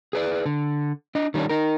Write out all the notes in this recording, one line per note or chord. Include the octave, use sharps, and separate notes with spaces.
G#4 B4 D5
D3
D4 D#5
D#3 G3 A#3 C#4 D4
D#4 A#4